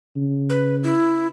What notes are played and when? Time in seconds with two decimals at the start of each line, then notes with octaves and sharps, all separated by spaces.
0.16 C#3
0.50 B4
0.83 E4